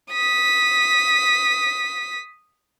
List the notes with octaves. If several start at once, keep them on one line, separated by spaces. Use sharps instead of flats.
D#6 B6